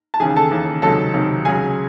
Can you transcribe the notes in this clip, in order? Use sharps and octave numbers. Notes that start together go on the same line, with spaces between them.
A5
D#2 C#3 E3 G#4 G#5
A4 A5
D#2 C#3 E3
C#2 C3 D#3 F#3 A4 A5
C#2 C3 D#3 F#3
C#2 C#3 F#3 G#4 G#5